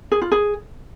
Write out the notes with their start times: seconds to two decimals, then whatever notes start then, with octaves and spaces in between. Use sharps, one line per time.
0.12 G#4
0.22 F4
0.32 G#4